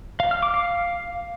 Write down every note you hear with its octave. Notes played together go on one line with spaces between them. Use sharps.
F5
F6
D6
F5